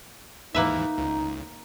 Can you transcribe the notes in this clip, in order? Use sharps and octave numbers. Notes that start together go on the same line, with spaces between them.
D#2 G#2 E3 A#3 D#4 B4 E5
C#2